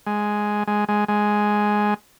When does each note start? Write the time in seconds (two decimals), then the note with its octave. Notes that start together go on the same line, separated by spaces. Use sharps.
0.06 G#3
0.67 G#3
0.88 G#3
1.08 G#3